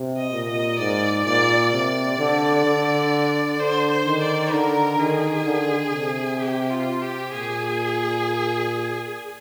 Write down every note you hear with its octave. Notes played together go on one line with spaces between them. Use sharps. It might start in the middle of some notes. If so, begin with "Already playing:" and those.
Already playing: C3
D#5
A#2
D#5
G#2 D5
A#2 D5
C3 D5
D3
D3
D3 C5
C5
D#3
D5
D3 A#4
D#3 G#4
D3
C3
G4
F4
G4
A#2 G#4